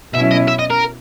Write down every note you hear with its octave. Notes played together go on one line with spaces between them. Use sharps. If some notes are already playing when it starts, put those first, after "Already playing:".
B2 F#3 C#4 E4 E5
D#5
E5
D#5
A#4